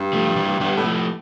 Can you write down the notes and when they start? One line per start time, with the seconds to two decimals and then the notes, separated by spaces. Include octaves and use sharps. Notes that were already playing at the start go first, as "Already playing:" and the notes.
Already playing: G2
0.13 F3 A3
0.27 F3
0.36 E3 G3
0.60 G2 G3 B3
0.77 A2
0.84 F3 A3
0.95 A2